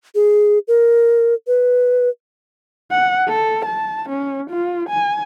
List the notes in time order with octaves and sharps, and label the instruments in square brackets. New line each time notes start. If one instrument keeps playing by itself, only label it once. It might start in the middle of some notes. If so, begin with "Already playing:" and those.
[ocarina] G#4
A#4
B4
[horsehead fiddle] F#5
A4
A5
C#4
F4
G#5